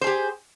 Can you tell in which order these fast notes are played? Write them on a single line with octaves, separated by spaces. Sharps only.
C5 G#4 G4